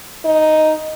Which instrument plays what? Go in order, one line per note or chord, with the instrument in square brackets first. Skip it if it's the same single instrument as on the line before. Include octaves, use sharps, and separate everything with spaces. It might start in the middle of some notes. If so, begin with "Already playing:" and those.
[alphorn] D#4